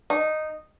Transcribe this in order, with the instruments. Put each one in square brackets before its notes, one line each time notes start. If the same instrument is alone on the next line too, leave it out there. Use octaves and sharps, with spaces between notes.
[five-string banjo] D#4